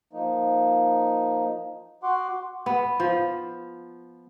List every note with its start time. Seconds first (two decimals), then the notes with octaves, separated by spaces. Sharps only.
0.13 F3 A#3 D#4
2.03 F#4 F#5 C6 D6
2.66 B3
3.00 F3